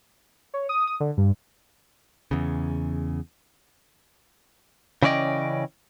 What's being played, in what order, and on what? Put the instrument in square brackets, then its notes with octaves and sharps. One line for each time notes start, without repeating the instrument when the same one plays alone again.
[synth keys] C#5
D#6
D#6
D3
G2
[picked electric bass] E2 C#3
[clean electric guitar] C#3 E3 C#4 D5 D#5 G5